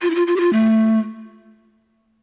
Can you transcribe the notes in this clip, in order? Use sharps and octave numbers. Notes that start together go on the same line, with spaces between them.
F4
E4
F4
F4
G4
F4
A3